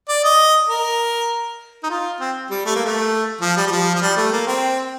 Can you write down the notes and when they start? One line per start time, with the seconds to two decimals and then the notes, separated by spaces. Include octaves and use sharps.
0.09 D5
0.24 D#5
0.69 A#4
1.83 D#4
1.90 F4
2.20 C4
2.51 G3
2.66 A3
2.75 A#3
2.85 A3
3.41 F3
3.57 G3
3.67 G3
3.71 F3
3.95 F3
4.01 G3
4.16 A3
4.32 A#3
4.47 C4